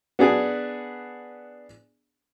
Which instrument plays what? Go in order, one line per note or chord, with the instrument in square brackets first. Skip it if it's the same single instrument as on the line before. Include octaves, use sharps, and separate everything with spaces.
[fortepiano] B3 D4 G#4